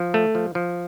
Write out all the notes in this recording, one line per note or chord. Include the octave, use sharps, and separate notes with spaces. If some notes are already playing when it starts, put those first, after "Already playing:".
Already playing: F3
A3
F3
F3